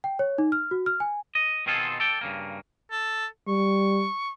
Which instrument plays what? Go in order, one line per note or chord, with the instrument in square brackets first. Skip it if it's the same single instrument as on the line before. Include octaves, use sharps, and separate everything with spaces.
[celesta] G5
C#5
D#4
F6
F#4
F6
G#5
[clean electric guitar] D#5
B2 D#3 C4 F4 G#4 A4
A4 D5 G5
G2 C#3 A#3
[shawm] A4
[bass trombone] G3 [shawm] C#6